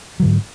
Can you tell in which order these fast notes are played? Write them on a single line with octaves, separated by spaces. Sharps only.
F#3 D3 G#2